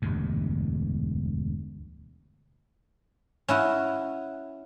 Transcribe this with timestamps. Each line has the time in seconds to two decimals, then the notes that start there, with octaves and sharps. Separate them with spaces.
0.02 E1 D2 G2
3.48 C#4 E4 F#4